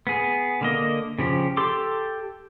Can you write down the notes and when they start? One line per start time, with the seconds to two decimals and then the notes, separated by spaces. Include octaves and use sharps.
0.07 B3 G#4
0.61 D3 A#3 D#5
1.19 C#3 F3 G4
1.57 G4 A4 C6 D6